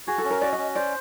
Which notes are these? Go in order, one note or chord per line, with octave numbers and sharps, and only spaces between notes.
F#4 G#4
A4
C#4
A#4
F#4 D5
D#5
C#4
C5 D5